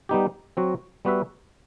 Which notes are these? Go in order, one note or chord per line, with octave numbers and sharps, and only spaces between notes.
G3 B3 D#4 G4
F#3 C4 F#4
G3 B3 F#4 B4 E5